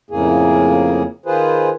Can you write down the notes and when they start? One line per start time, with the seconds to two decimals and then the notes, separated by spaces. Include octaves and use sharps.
0.10 F2 A2 C#3 A#3 G#4
1.26 D#3 F4 G#4 B4 C5